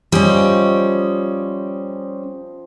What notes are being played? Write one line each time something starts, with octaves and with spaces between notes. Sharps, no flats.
F3 G3 C#4 D#5 G5